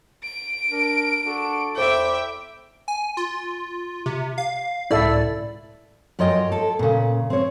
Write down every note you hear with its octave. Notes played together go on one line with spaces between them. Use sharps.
D7
D4 A#4
D4 F#4 A4
E2 E4 A4 C5 E5 G5 D6
G#5
F4
C3
F5
C#2 A2 E4 A4 D5 E5
F#2 F#3 F4 C#5 D#5 G5
A4
A#2 C#3
C4 C#5